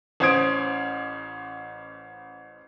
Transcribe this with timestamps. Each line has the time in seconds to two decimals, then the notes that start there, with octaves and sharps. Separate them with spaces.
0.20 A1 C#4 C5 D#6 G#6 D7